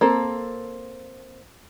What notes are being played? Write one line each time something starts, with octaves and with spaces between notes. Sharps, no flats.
A#3 C4 A4